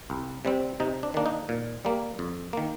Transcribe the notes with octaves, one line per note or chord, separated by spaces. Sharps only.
C2
C3 G3 C4
C3 D#4
D4
D#3 A#3 D4
D#4
A#2
G3 A#3
F2
D#3 A#3